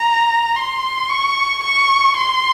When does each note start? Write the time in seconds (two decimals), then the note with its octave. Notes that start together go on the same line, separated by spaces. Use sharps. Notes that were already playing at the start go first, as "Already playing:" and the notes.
Already playing: A#5
0.56 C6
1.09 C#6
1.63 C#6
2.16 C6